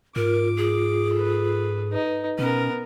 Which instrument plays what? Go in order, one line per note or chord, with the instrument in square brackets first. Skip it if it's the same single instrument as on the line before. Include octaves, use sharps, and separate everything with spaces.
[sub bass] G#2 [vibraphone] F4 [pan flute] A#4 [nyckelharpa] D6
[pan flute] G#4
[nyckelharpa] A4 B4
[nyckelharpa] D#4 [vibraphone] B4
[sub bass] B2 [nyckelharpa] B3 A#4 [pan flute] C#4